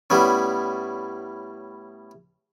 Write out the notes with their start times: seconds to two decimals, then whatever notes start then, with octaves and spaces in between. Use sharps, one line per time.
0.10 A2 G3 B3 C#4